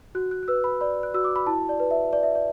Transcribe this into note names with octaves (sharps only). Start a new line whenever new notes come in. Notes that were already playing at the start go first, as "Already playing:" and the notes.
F#4 F#6
F#6
F#6
B4 E6
B5
D5 B5
F#6
F#4 E6
D6
B5
E4 A5
D5
B4
E5
D5
E5
D5